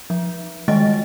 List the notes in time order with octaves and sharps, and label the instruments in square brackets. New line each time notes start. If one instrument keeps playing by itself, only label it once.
[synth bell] F3
D#3 G3 G#3 D#5 A6